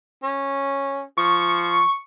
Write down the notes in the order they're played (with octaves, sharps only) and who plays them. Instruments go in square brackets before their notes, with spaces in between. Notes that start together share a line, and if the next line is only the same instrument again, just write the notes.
[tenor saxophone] C#4
[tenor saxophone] F3 [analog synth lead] C#6